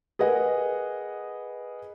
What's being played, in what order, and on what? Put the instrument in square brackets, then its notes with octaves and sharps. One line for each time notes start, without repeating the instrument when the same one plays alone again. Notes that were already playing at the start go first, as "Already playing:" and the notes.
[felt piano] G#4 A#4 B4 D#5 F#5